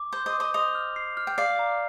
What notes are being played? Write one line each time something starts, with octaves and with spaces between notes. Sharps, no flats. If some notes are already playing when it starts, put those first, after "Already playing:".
Already playing: D6
C5 G6
C5 D#5
D6
C5 D#5
C5 D#5 F7
F6
C7
F6
G5
D5 F5 C7
A#5